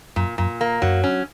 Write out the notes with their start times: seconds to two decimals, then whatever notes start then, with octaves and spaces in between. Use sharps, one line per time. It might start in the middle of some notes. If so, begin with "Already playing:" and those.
0.16 F#2 A#2
0.38 F#2 A#2
0.61 A#3
0.82 F#2 F#3
1.04 C#4